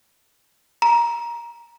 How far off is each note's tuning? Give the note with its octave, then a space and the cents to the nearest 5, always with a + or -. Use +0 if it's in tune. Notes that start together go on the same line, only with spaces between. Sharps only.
A#5 +15